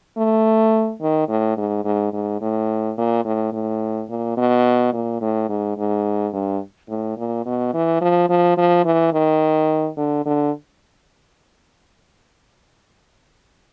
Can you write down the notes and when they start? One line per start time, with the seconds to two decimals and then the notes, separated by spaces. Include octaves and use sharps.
0.18 A3
1.02 D#3
1.29 A2
1.58 G#2
1.85 G#2
2.13 G#2
2.41 A2
2.98 A#2
3.25 A2
3.53 A2
4.09 A#2
4.37 B2
4.93 A#2
5.21 A2
5.49 G#2
5.78 G#2
6.33 G2
6.89 A2
7.18 A#2
7.46 B2
7.74 E3
8.01 F3
8.29 F3
8.57 F3
8.85 E3
9.13 D#3
9.97 D3
10.26 D3